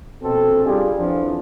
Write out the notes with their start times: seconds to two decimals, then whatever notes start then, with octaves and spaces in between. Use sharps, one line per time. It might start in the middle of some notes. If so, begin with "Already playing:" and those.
0.23 A#1 B2 C4 A4
0.65 G3 D4 F4 G4 G#4
0.97 F2 E3 F3 D4